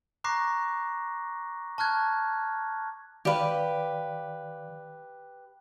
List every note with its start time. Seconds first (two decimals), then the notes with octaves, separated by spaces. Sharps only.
0.24 A#5 C#6 D6 F#6 A#6 C7
1.78 A5 C#6 F6 F#6 G#6
3.25 D#3 G4 B4 D5 F5